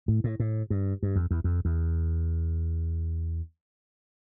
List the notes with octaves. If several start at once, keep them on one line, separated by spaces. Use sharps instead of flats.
A2
A2
A2
G2
G2
F2
E2
F2
E2